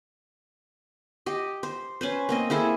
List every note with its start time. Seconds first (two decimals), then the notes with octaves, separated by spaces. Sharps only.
1.26 G4 D#5
1.63 C5
2.01 C#4 B4 C5
2.29 A#3 C4 D#5
2.50 A#3 E4 G#4 A4